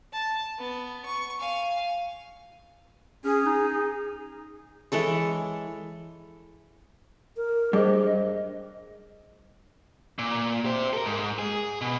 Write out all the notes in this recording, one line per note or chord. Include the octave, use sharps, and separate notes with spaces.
A5
B3
C#6
F5 G#5
C#4 G#4
D#4
E3 G#3 A4 C#5
A#4
G2 G3 G#4 C5 D#5
A#2
G4 C5
A4 A#4
G#2
G#4
B2